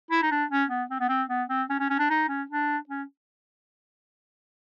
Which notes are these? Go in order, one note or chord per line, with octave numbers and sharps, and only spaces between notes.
E4
D#4
D4
C#4
B3
C4
B3
C4
B3
C4
C#4
C#4
C#4
D4
D#4
C#4
D4
C#4